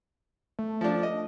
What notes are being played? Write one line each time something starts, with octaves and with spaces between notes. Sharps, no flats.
A3
F3 D4
D#5